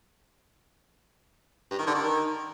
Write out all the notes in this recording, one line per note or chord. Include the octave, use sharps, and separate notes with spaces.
G2
D#3
D3
D#3